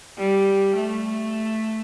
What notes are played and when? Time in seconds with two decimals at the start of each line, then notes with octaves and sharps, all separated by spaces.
0.17 G3
0.76 A3